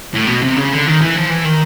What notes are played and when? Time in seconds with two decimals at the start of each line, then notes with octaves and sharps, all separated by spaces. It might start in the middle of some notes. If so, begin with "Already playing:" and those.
0.14 A2
0.28 B2
0.42 C3
0.57 C#3
0.72 D3
0.87 D#3
1.01 E3
1.16 F3
1.29 E3
1.45 D#3